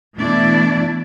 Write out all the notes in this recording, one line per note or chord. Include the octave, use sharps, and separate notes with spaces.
B2 E3 A3 D4 E4 D5